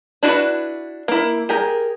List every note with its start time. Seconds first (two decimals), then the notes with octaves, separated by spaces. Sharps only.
0.23 D4 E4 F#4 G#4 B4
1.08 A#3 E4
1.49 G4 G#4 A#4